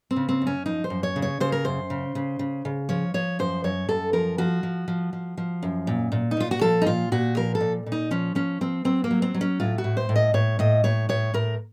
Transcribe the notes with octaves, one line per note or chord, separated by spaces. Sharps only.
C4
C#3
C4
F#2
C#4
F3 D#4
C5
F#2
C#5
C#3
C#5
C#3 C5
A#4
F#2 C5
C#3
C#3
C#3
C#3
F3 C#5
F3 C#5
F#2 C5
F#2 C#5
F#2 A4
F3 A#4
F3 F#4
F3
F3
F3
F3
F#2
A#2
A#2
D#4
A#2 F4
F#4
F3 A4
D#4
A#2 F4
A#2 F#4
F3 A#4
A4
A#2
A#2
D#4
F3 C#4
F3 C#4
F3 C4
F#3 C4
A#3
F#3
C4
F#3
C#4
A2 F4
F#4
A2
C5
A2
D#5
A2 C#5
A2 D#5
A2 C#5
A2 C#5
A2 A#4